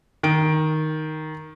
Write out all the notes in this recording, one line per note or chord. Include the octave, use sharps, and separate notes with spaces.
D#3 D7